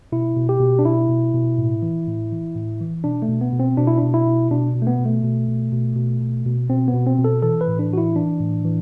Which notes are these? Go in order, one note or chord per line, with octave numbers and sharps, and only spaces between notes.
B2 E4
B2
G4
B2
D4
B2 E4
B2
B2
A2
E3
A2
E3
A2
E3
B2 D4
A3
B2
B3
B2
C4
B2 D4
E4
B2 D4
E4
B2
B2 D4
B2
A3
B3
B2
A3
B2
B2
B2
B2
B2
B2
B2 C4
B3
B2
C4
B2
A4
E3 A4
B4
A2
D4
E3 F#4
E4
E3 D4
A2
E3